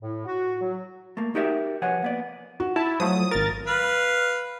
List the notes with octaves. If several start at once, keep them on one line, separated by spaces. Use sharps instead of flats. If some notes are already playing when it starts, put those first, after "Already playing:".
A2
F#4
F#3
A3 A#3
D#4 F#4 G4 A#4 D5 E5
C2 F3 B4 C#5 F#5 G#5
A#3 B3 D5
F#4
E4 A5
F3 F#3 A3 D#6
G#1 A#4 A6
B4 F5